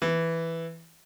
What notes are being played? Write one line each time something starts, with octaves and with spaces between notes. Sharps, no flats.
E3